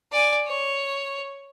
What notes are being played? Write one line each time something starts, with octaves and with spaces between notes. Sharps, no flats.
D5 G#5
C#5